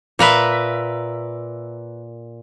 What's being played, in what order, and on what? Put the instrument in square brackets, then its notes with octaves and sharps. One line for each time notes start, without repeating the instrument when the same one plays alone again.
[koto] A#2 A#4 B4 E5